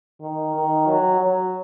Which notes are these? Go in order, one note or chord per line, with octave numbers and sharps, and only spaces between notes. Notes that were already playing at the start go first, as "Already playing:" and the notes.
D#3
D#3
F#3
F#3